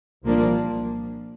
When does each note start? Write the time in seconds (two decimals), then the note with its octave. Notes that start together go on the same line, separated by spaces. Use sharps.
0.24 C2 A#2 F3 A#3 D4